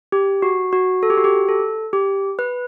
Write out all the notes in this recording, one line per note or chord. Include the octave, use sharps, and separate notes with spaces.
G4
F#4
F#4
A4
G4
F#4
G4
A4
G4
B4